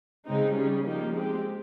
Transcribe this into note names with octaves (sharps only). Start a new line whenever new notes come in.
C#3 G#3 C4 D#4
G3 C#4 G#4
F3 A#3 D#4 G4
G#3 C4 G4